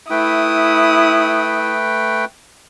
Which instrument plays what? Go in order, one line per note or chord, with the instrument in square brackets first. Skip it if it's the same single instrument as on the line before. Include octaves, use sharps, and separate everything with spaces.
[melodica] A3 B4 G5 [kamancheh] E4 D#6